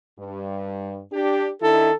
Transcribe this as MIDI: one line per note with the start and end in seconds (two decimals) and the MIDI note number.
0.19 1.00 43
1.12 1.51 62
1.12 1.51 67
1.62 1.91 51
1.62 1.91 62
1.62 1.91 64
1.62 1.94 69